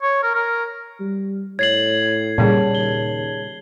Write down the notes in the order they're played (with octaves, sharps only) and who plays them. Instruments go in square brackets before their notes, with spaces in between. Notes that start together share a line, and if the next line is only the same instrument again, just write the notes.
[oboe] C#5
A#4
A#4
[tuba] G3
[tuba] A2 [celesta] C#5 A6 [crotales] G#6 C7 F#7
[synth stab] A#2 C#3 G3 [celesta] G#4 C#5 A5
[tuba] D#2 [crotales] G7